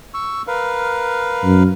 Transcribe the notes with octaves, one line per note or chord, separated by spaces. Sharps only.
C#6 E6
A#4 B4 F5
F#2